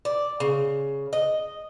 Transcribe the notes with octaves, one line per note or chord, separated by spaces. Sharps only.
D5
C#3
D#5